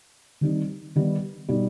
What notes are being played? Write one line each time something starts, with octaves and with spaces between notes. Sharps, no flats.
D#3 G3 C4 D#4
D#3 G3 B3
B2 G3 B3 D#4